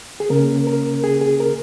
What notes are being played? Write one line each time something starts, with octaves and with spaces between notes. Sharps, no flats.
G#4
C#3 A#3 C#4 A#4
A#4
G#4
G#4
A#4